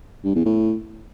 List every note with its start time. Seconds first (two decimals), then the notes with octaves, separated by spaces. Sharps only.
0.24 G2
0.35 E2
0.46 A2